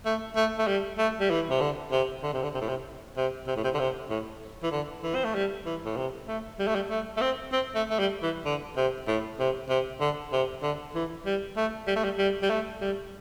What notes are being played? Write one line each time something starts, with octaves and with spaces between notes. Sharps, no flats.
A3
A3
A3
G3
A3
G3
E3
C3
D3
C3
D3
C3
D3
C3
A2
C3
C3
C3
A2
C3
D3
C3
A2
E3
D3
E3
C4
A3
G3
E3
A2
C3
A3
G3
A3
G3
A3
A3
C4
C4
A3
A3
G3
E3
D3
C3
A2
C3
C3
D3
C3
D3
E3
G3
A3
G3
A3
G3
G3
G3
A3
G3